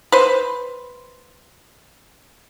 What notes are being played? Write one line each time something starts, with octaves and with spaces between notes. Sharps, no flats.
B4 C5